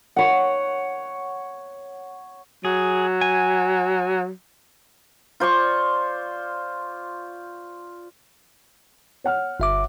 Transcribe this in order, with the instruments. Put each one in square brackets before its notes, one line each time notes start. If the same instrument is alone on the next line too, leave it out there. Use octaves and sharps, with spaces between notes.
[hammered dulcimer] C#5 F#5
[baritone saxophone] F#3 [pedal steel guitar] G#4
[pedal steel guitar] G#5
[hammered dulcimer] F4 C5 D5 C#6
[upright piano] C#5 F#5 F6
[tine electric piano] G1 E5 D6